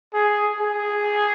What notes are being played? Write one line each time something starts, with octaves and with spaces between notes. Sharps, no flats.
G#4
G#4